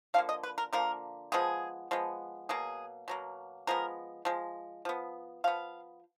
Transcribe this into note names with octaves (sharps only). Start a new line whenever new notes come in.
D3 F3 A#3 F5
D#5
B4
A#4
D3 F3 A#3 A#4
F3 G#3 B3 G#4
F3 G#3 B3
B2 F#3 A#3 G#4
B2 F#3 A#3
F3 G#3 B3 A#4
F3 G#3
F3 B3
F3 B3 F5